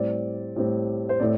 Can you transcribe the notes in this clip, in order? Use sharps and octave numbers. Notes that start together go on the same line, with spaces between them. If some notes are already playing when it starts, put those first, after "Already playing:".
Already playing: A2 G3 C4 D5
A2 G3 C4
C5
A2 A3 C4 D5